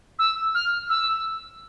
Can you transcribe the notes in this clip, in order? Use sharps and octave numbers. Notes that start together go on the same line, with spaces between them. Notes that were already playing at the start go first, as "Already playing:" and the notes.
E6
F6
E6